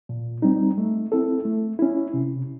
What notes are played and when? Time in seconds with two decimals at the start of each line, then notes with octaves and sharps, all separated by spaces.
0.09 A#2
0.42 G3 C4 D#4
0.78 A3
1.12 C4 E4 A4
1.45 A3
1.79 C#4 E4
2.14 C3